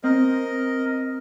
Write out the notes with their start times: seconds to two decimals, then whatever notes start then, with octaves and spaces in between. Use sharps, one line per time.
0.04 C4 A#4 D#5